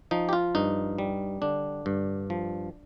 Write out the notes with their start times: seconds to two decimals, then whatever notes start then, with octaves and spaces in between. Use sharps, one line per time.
0.11 F3 D#4
0.29 G4
0.33 F4
0.55 G2 D#4
0.98 G3
1.42 D3 D4
1.86 G2
2.30 F3